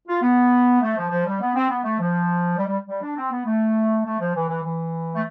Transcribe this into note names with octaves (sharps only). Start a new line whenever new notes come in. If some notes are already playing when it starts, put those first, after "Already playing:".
F4
B3
A3
F3
F3
G3
B3
C4
B3
A3
F3
G3
G3
G3
D4
C4
B3
A3
A3
F3
E3
E3
E3
A3